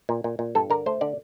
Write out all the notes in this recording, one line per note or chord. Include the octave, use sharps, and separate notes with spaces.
A#2
A#2
A#2
G2 A4
D3 A#4
A3 C5
D3 D5